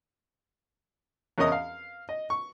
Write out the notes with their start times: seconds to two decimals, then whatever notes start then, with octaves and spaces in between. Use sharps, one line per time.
1.38 E2 C#4 A#4 D#5 D#6
1.52 F5
2.09 D#5
2.30 C#6